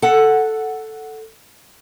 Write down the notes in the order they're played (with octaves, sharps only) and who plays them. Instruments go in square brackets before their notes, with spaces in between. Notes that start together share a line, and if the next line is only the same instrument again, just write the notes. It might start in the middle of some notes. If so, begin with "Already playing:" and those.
[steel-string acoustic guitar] A4 F#5